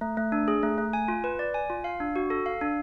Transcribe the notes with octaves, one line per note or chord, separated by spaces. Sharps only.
A3
A3
D4
G#4
A3
A3
G#5
F4
B4
D5
G#5
F4
F5
D4
F#4
A4
F5
D4